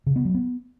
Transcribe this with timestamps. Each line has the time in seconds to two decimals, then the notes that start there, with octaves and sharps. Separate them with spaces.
0.06 C#3
0.16 B3
0.25 F#3
0.34 B3